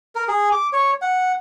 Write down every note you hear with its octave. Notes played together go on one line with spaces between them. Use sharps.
A#4
G#4
D6
C#5
F#5